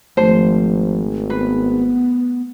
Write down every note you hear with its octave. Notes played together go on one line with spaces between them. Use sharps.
G#1 F3 A3 C5
B3 B4